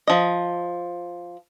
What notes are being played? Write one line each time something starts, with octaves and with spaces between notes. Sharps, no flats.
F3 D#5